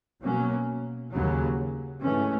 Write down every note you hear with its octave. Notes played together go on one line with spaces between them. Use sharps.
B2 F#3 A#3 C#4
D#2 C#3 F#3
G#2 E3 A3 C#4